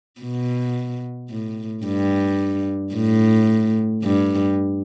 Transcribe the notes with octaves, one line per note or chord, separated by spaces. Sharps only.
B2
A2
G2
A2
G2